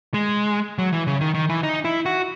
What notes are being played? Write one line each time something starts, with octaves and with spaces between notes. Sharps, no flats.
G#3
F#3
E3
C#3
D#3
D#3
E3
D#4
E4
F#4